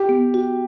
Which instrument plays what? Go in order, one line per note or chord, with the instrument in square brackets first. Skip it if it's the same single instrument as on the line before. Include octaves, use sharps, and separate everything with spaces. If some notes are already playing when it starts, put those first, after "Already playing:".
Already playing: [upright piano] G4
[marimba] B3
F#4